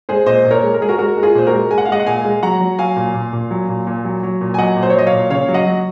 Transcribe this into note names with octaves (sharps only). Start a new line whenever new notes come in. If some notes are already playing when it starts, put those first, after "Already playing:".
G#3 G#4 C5
A#2 C5 D#5
A#2
A#4 C#5
G#3
A#4
G#3 G#4
F#4 A#4
G#3 F#4 A#4
G#3
F4 G#4
A#2 C5
F#4 A#4
G#3
G#3 G#5
F#5
F5
G#3 D#5 F#5
F#5
A#2 F5 G#5
G#3
F#3 F#5 A#5
F#3
F#3 F5 G#5
A#2
A#2
A#2
F#3
A#2
A#2
F#3
F#3
A#2
G#5
F#3 D#5 F#5
A#2
C5
C#5
F#3 D#5
C#5 F5
A#2
C#3 C#5 F5
F#3
D#5 F#5
F#3